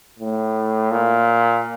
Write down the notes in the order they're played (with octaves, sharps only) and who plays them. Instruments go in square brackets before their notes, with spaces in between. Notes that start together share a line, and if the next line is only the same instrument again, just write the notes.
[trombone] A2
A#2